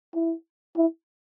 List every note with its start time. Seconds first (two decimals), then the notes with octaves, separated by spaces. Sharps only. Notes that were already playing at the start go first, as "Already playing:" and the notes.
0.14 E4
0.76 E4